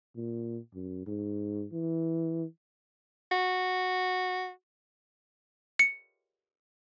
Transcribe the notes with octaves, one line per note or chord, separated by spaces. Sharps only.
A#2
F#2
G#2
E3
F#4
C#7